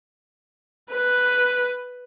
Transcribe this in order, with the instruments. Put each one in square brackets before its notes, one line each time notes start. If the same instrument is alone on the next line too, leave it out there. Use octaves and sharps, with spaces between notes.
[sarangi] B4